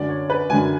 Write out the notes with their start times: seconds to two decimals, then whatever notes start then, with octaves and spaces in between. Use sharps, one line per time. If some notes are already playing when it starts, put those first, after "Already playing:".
Already playing: F#2 D3 F#3 D5
0.09 C#5
0.30 B4
0.50 F#2 D3 F#3 G#5